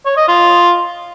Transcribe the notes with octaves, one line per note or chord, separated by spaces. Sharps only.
C#5
D#5
F4